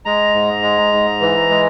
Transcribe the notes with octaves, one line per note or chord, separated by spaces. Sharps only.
G#3 A#5
G#2
G#3
G#2
E3
G#3